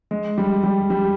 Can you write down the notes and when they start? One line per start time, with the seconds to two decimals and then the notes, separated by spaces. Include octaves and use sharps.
0.11 G#3
0.38 G3
0.63 G3
0.90 G3